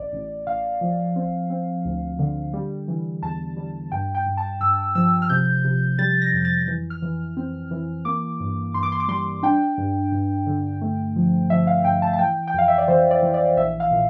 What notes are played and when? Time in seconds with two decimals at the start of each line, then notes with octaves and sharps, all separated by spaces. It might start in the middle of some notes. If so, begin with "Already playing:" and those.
Already playing: A1 D5
0.13 A1
0.47 A1 F5
0.81 F3
1.16 C4
1.50 C4
1.85 D2
2.19 D3
2.53 G3
2.88 E3
3.22 E2 A5
3.57 G3
3.92 G2 G5
4.15 G5
4.26 G2
4.37 A5
4.60 G2 E6
4.95 F3 E6
5.22 F6
5.30 C3 G6
5.65 C3
5.99 G3 A6
6.22 A#6
6.33 F2
6.45 A6
6.68 E3
6.90 F6
7.02 E3
7.37 C4
7.71 E3
8.05 A#3 D6
8.40 G2
8.74 G2 C6
8.83 D6
8.92 C6
9.00 D6
9.08 G3 C6
9.43 D4 G5
9.78 G2
10.12 G2
10.46 D3
10.81 A3
11.16 F3
11.50 F3 E5
11.67 F5
11.84 G2 G5
12.02 A5
12.13 A5
12.19 E3 G5
12.48 G5
12.54 F2 F5
12.68 E5
12.78 D5
12.88 E3 C5
13.11 D5
13.23 E3
13.34 D5
13.57 A#1 E5
13.80 F5
13.91 A#2